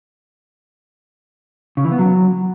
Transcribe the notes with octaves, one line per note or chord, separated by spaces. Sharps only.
C#3
E3
B3
F#3